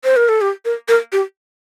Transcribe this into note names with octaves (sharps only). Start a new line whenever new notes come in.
C5
A#4
A4
G4
A#4
A#4
G4